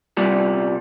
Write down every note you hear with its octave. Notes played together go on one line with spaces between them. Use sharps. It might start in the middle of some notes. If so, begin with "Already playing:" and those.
C2 A#2 G3